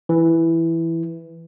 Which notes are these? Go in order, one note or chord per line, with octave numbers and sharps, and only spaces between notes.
E3